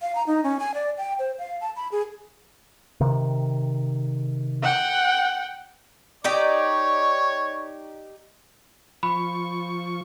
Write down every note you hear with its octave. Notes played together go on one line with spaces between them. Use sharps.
F5
A#5
D#4
C#4
G#5
D5
G5
C5
F5
A5
B5
G#4
C3 D#3
F#5 G5
D#4 G4 C#5 D5
F3 B5 C#6